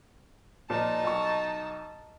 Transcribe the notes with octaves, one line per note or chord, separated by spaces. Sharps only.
A#2 F3 D#4 A5
B1 C#6